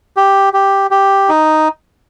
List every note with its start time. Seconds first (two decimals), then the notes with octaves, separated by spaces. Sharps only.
0.17 G4
0.53 G4
0.91 G4
1.29 D#4